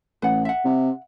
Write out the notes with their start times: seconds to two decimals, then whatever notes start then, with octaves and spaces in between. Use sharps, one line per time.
0.22 A1 B4 F#5
0.45 E5 F#5
0.65 C3